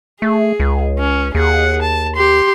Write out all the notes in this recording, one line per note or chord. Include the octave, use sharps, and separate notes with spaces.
A3 G#4
C#2
C#4
D#2 G#4 F#5
A5
G4 C6